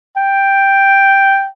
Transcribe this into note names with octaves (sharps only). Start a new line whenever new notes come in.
G5